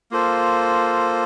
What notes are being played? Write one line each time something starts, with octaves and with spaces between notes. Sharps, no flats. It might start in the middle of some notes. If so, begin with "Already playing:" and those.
A#3 F4 A4 C5